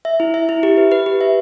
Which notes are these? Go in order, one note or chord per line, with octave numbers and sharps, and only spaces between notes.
E5
E4
E5
E4
G4
B4
B4
G4
E5